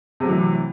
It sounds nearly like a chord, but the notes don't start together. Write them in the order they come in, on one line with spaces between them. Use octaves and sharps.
C3 F#3 A3 E3